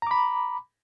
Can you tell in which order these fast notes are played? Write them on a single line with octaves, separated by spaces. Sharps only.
A#5 D6 B5